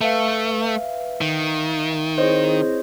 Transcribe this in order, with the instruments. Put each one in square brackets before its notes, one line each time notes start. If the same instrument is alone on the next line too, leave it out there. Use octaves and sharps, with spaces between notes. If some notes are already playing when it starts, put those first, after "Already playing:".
[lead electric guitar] A3 [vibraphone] B4 [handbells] E5 F5
[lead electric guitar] D#3
[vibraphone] C4 E4 G#4 [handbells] C5 C#5 D#5